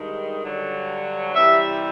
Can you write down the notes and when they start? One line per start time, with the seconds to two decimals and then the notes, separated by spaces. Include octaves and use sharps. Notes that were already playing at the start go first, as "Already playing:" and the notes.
Already playing: G2 D#3 G#3
0.44 G2 D3 F#3
1.34 C3 E3 G3 E5